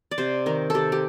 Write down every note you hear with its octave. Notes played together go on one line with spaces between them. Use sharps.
D5
C3 C5
D#3 A#4
C3 G4 A4
G4